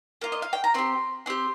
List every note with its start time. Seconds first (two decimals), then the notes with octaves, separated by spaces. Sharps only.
0.21 A#3 F4
0.32 D#5
0.42 F5
0.53 G5
0.64 A#5
0.74 C4 G4 C6
1.26 C4 G4 C6